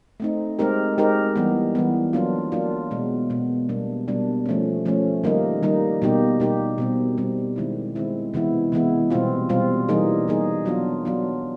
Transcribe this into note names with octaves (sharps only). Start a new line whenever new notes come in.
A3 C4 D#4
G#3 C4 D#4 G4 A#4
G#3 C4 D#4 G4 A#4
E3 G3 B3
E3 G3 B3
F#3 A#3 D4 F4
F#3 A#3 D4 F4
B2 G#3 B3
B2 G#3 B3
B2 G3 A#3 D4
B2 G3 A#3 D4
F3 A3 C#4
F3 A3 C#4
D#3 G3 A#3 D#4
D#3 G3 A#3 D#4
B2 G3 A#3 D#4 G4
B2 G3 A#3 D#4 G4
B2 G3 C4
B2 G3 C4
D#3 G#3 C4 E4
D#3 G#3 C4 E4
C3 E3 G#3 B3 E4
C3 E3 G#3 B3 E4
B2 G3 C4 F4
B2 G3 C4 F4
E3 G3 A#3 D#4 G#4
E3 G3 A#3 D#4 G#4
F#3 B3 D4 F4
F#3 B3 D4 F4